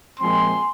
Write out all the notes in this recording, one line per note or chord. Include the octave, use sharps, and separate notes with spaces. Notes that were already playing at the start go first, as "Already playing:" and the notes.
A#2 F3 G#3 C4 G#5 C6